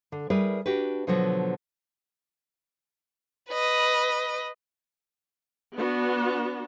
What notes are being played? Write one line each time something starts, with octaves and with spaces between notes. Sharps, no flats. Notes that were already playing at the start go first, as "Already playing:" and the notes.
D3
G3 E4 G#4 A#4 B4
D4 F#4 G4 B4
B2 D3 F3 F#3 F#4
B4 D#5
B3 D4 F#4